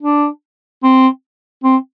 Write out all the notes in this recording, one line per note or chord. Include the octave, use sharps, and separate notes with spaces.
D4
C4
C4